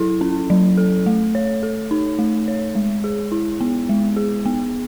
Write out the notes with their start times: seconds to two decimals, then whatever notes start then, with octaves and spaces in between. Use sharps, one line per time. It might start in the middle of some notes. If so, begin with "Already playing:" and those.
Already playing: F#3 E4 A4
0.21 C#4
0.50 F#3
0.77 A4
1.06 A3
1.35 C#5
1.63 A4
1.91 D#4
2.19 A3
2.48 C#5
2.75 G#3
3.04 G#4
3.32 E4
3.61 B3
3.89 G#3
4.16 G#4
4.46 B3